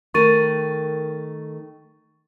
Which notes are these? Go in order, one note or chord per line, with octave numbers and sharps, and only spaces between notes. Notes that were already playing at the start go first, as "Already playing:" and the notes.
D#3 A3 A#4 C#6 A6 D#7